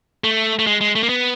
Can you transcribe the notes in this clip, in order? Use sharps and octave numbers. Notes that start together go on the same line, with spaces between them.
A3
A3
G#3
G#3
A3
A#3
B3